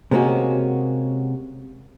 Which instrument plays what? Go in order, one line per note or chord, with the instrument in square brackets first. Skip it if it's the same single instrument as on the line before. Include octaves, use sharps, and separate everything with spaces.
[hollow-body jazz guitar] C3 G#3 A#3 C#4 F#4